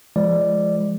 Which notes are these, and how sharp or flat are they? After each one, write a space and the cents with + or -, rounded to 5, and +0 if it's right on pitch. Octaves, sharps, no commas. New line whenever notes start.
F3 -25 G#3 +0 D5 +0